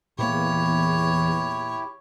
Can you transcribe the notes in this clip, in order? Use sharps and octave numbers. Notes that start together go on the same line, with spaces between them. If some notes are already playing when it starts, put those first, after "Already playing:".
E2 A#2 A#3 E4 G4 C#5